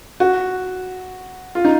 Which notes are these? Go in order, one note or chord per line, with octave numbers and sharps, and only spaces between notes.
F#4
F4
D#4